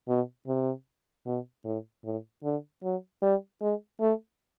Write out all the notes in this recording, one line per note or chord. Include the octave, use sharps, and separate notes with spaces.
B2
C3
B2
A2
A2
D3
F#3
G3
G#3
A3